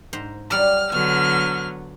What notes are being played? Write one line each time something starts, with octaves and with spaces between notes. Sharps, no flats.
G#2 C5 A#5
F#3 G3 D5 F6
D3 F#3 B3 G#5 F6